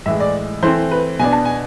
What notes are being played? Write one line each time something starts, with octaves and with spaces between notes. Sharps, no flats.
A2 E3 G#3 E5
D5
E3 A3 C4 C5
B4
B2 B3 D4 G#5
A5
G#5